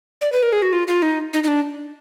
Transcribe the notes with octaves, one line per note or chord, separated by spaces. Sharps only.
D5
B4
A#4
G#4
F#4
F4
F4
D#4
D#4
D#4
D4